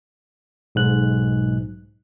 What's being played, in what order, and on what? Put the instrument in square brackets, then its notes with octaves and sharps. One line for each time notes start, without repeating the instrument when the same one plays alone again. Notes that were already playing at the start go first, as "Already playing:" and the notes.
[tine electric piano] B1 G#2 F#6